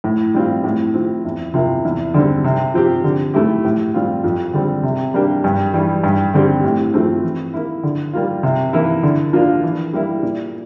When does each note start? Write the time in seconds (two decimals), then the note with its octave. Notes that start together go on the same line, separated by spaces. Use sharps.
0.04 A2
0.34 G3 C4 F4
0.64 A2
0.94 F3 C4
1.25 E2
1.54 C3 F3 A#3 E4
1.85 E2
2.14 D3 G3 C4
2.44 C3
2.74 F3 C4 G4
3.04 D3
3.34 A3 E4 G4
3.65 A2
3.94 G3 C4 F4
4.24 F2
4.53 D3 G3 C4
4.83 C3
5.14 G3 A#3 D4 G4
5.44 G2
5.74 E3 G3
6.04 G2
6.34 D3 G3 C4 G4
6.64 A2
6.94 F3 A3 C4
7.23 E3
7.54 A#3 E4
7.83 D3
8.13 G3 A#3 F4
8.43 C3
8.73 E3 A#3 E4
9.03 D3
9.33 F3 A#3 D4 F4
9.63 E3
9.93 G3 A#3 E4
10.23 A#2